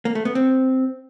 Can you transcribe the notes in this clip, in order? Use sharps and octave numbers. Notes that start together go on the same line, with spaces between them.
A#3
A3
B3
C4